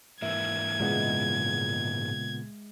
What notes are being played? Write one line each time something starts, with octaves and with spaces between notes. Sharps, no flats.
G#2 E3 A#3 E5 G#6
A#2 C#3 G#3 B3